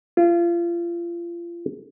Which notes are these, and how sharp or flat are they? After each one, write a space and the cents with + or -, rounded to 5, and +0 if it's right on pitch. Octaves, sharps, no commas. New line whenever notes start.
F4 -30